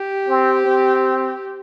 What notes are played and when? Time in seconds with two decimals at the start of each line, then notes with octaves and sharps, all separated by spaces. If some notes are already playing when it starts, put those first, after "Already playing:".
Already playing: G4
0.29 C4
0.66 C4